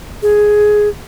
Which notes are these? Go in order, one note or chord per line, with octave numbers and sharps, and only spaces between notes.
G#4